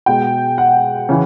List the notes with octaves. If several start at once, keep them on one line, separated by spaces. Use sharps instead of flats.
B2 G#3 G5
F#5
C#3 E3